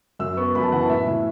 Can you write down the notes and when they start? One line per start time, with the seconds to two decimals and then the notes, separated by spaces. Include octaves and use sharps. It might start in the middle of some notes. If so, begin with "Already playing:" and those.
0.19 F#2 E6
0.37 B3 C#6
0.55 F#2 B5
0.63 A5
0.72 E3 F#5
0.81 A5
0.89 A2 E5
1.07 A2 E5